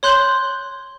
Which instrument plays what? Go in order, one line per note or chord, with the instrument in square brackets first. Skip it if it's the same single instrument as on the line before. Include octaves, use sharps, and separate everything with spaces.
[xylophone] C#5 C6 F#6 G6 F#7 G7